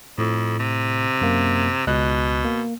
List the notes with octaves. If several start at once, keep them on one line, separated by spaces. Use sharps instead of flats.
F2 A2
C3
F#2 A#3
C#2 B2 D#5 F#6
A#3